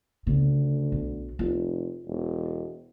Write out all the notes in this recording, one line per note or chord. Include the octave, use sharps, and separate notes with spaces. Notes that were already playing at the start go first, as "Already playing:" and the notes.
D2 C#3
B1
F1 F4
E1